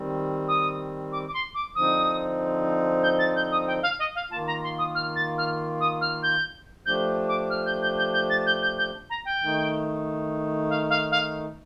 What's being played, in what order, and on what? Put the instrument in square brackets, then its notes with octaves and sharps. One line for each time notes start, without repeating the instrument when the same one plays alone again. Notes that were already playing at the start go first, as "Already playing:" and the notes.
Already playing: [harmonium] D#3 G3 C4
[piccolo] D#6
D6
D6
C6
D6
[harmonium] D3 F3 C4 D#4 [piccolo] D#6
[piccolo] G6
A6
G6
D#6
G5
F5
D#5
F5
[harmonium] D#3 A#3 F4 [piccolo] A5
[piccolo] A#5
C6
D#6
F6
A6
F6
D#6
F6
G6
[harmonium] F3 A3 D4 G4 [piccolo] G6
[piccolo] D6
F6
G6
G6
G6
G6
A6
G6
G6
G6
A#5
G5
[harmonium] D#3 A3 D#4
[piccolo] F5
F5
F5